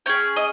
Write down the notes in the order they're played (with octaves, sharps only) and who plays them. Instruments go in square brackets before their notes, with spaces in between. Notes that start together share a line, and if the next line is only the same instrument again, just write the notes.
[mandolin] C#4 G#4 G5
D#5